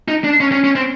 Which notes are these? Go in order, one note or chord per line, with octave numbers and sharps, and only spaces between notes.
D#4
D4
C#4
C#4
C#4
C4